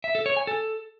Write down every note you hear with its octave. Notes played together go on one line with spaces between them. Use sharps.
E5
A4
C#5
G#5
A4